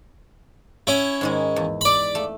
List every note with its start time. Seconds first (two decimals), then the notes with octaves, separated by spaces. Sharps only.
0.87 C#4 E4
1.21 G#2 D#3 G#3
1.56 E2
1.81 D5 B5
2.15 A3